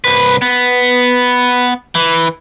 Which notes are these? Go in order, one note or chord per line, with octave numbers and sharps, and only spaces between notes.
C2 B4
B3
E3